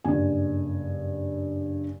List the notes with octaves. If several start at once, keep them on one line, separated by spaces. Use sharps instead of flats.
F#1 G2 G#5